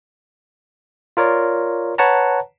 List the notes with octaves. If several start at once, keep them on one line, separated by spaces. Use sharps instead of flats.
F4 A#4 C#5 D5
B4 C#5 F#5 A5 A#5